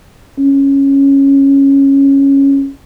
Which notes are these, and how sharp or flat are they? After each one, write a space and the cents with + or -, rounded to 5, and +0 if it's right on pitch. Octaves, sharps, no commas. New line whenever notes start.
C#4 -10